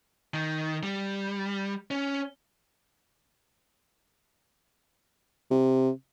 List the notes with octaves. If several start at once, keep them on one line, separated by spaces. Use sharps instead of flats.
D#3
G3
C#4
C3